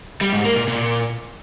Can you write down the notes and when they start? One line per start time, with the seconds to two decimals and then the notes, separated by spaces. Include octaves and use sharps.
0.21 G3
0.33 G#2
0.44 A#3
0.56 A#2
0.68 A#2